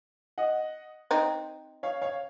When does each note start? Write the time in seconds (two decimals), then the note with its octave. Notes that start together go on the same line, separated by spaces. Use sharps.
0.38 D#5 F#5
1.11 C4 D#4
1.83 C#5 F5
2.02 C#5 F5